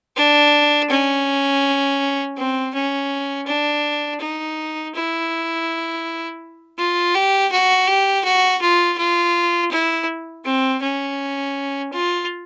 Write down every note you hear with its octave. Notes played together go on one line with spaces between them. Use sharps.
D4
C#4
C4
C#4
D4
D#4
E4
F4
G4
F#4
G4
F#4
F4
F4
E4
C4
C#4
F4